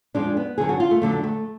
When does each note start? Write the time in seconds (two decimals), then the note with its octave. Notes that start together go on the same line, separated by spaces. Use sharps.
0.14 F2 F3 G#3 D4
0.37 B3
0.58 F#2 D3 F#3 G#4
0.69 F#4
0.80 F4
0.91 A3
1.02 F2 D3 F#3 A3
1.24 A3